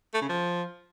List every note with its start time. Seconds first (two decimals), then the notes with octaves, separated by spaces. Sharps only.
0.14 A3
0.22 C#3
0.29 F3